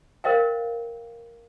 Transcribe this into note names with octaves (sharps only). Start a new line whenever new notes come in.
A#4 C5 D#5 F5 G5